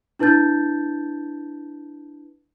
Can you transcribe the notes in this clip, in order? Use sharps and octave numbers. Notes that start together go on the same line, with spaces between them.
D4 E4 B4 A5 G6 A6